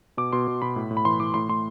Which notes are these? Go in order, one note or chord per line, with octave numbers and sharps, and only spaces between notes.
B2 D6
B2 C6
B2
B2 B5
A2
A2
B5
E3 C6
E3 D6
A2 C6
A2 C6